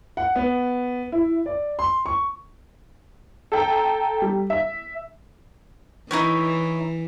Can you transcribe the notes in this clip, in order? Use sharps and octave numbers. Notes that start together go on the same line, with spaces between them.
F#5
B3
E4
D5
C6
C#6
A4 G5 A#5
G3
E5
E3 D#4 E4 C#5